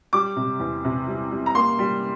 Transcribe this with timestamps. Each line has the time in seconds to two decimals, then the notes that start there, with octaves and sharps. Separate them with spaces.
0.13 G3 D6
0.36 C3
0.60 E2
0.85 C3
1.07 G3
1.31 G3
1.46 A#5
1.55 A#3 C6
1.79 G3